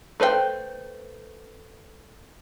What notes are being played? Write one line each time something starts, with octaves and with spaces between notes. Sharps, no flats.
A3 B4 C5 D5 G5